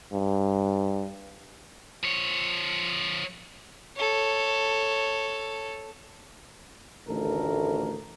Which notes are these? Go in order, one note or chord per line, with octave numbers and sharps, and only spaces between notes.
G2
F3 C#5
A4 C#5
A1 D2 D#3 A4 A#4